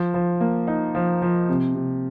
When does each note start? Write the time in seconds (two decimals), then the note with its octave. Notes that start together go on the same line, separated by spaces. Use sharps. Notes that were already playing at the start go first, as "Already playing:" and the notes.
Already playing: F3
0.14 F3
0.41 A#3
0.67 D#4
0.95 F3
1.22 F3
1.49 C3
1.75 C3